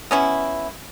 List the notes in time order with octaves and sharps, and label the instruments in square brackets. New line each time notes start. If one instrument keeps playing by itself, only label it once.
[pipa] B3 C#4 E4